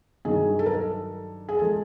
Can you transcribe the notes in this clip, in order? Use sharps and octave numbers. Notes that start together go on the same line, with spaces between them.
G2 D#3 F#3 G#4
A4
A#4
A4
G#4
F3 G#3 A4